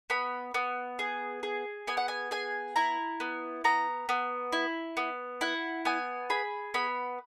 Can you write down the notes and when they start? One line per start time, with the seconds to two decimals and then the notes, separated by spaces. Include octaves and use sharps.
0.10 B3 B5
0.54 B3
0.99 G#4
1.43 G#4
1.87 B3 G#5
1.97 F#5
2.08 G#5
2.31 G#4 G#5
2.76 E4 A#5
3.20 B3
3.64 B3 A#5
4.09 B3
4.52 E4
4.97 B3
5.41 E4 F#5
5.85 B3 G#5
6.30 G#4 B5
6.74 B3 B5